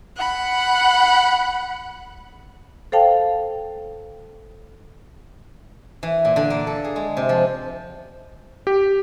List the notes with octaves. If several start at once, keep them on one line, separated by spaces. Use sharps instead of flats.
F#5 B5
A4 C5 F5 G5 A5
E3
A#2
D3
A#3
A4
G#4
G#3
C3
F3
G4